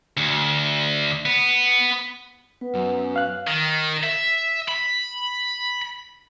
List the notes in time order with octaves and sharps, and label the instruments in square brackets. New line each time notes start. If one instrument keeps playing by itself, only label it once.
[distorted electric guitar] D2
B3
[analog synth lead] B3 [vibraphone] B4
[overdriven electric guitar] F#2
[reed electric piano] F5 F#6
[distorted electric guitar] D#3
E5
B5